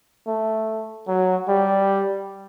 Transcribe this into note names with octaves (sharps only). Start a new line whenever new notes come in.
A3
F#3
G3